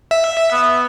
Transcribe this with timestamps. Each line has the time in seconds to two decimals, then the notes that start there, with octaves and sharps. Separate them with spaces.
0.11 E5
0.52 B3